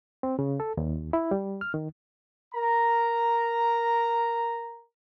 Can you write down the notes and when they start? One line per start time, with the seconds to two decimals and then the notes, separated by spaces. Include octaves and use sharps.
0.23 C4
0.39 C#3
0.60 A4
0.77 D#2
1.13 E4
1.31 G3
1.61 F6
1.74 D#3
2.55 A#4 A#5